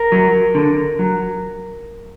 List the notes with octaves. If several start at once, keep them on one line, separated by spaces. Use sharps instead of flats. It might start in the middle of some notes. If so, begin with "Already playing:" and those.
Already playing: A#4
F#3
D3
F#3